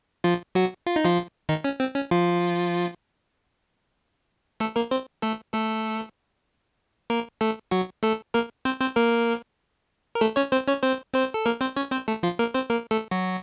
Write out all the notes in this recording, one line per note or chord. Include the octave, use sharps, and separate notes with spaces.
F3 F4
F#3 F#4
F4
D#4
F3 F4
D#3 D#4
C#4
C4
C#4
F3 F4
A3 A4
A#3 A#4
C4 C5
A3 A4
A3 A4
A#3 A#4
A3 A4
F#3 F#4
A3 A4
A#3 A#4
C4 C5
C4 C5
A#3 A#4
A#4
A3 A4
C#4 C#5
C4 C5
C#4 C#5
C4 C5
C4 C5
A4
A#3 A#4
C4 C5
C#4 C#5
C4 C5
A3 A4
F3 F4
A#3 A#4
C4 C5
A#3 A#4
A3 A4
F#3 F#4